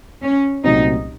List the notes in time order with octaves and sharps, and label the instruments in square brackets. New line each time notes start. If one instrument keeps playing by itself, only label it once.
[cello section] C#4
[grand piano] C2 A#2 F#3 A3 C4 [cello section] D#4